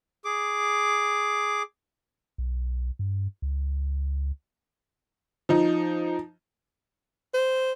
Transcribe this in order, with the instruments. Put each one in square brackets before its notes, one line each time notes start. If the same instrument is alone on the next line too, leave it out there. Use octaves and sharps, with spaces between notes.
[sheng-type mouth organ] G#4 D6
[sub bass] B1
G2
C#2
[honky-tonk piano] F3 D#4
[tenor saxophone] C5